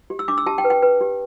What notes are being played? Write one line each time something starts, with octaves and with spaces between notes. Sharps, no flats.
G4
E6
D4 D6
E6
G4 A5
G5
B4
G5
B4
G4